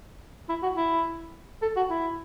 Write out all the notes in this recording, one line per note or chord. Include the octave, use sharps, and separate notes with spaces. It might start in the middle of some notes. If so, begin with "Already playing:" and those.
E4
F#4
E4
A4
F#4
E4